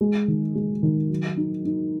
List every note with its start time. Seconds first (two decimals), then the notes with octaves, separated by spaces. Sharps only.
0.01 G#3
0.28 D#3
0.55 G#3
0.83 D#3
1.10 F#3
1.37 D#4
1.65 D#4